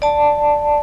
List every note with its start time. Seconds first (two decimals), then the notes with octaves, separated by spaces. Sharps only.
0.02 D5 A5